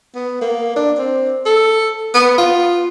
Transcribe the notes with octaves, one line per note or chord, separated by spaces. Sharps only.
B3
A#3
D4
C4
A4
B3
F4